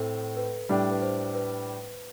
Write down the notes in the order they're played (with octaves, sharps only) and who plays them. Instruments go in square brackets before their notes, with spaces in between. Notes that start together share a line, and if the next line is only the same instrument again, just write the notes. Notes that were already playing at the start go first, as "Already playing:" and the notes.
Already playing: [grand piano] A2 C4 [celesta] A4
[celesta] B4
[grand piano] A2 G3 D4
[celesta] B4
C5
B4